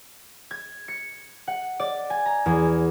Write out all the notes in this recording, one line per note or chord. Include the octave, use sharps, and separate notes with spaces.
G#6
C#7
F#5
D5
G#5
A#5
E2